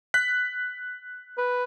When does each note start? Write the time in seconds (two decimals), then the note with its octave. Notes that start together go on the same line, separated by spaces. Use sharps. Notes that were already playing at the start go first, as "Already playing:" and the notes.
0.14 F#6 B6
1.38 B4